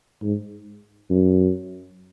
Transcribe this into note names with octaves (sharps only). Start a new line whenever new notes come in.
G#2
F#2